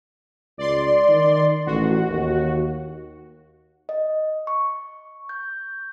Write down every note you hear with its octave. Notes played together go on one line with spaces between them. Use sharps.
C#2 D5 C6
D#3
A1 F#4
D#2
D#5
C#6
G6